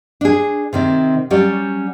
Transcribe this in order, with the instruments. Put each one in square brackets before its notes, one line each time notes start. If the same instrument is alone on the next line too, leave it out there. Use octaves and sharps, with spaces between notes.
[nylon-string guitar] D4 G#4
C3 D#3 C4
F#3 G3 C#4 G4 D5